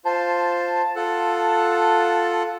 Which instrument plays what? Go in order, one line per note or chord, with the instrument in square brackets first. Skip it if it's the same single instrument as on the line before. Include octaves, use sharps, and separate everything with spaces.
[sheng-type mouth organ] F4 C5 [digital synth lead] A5
[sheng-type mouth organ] F4 A4 F#5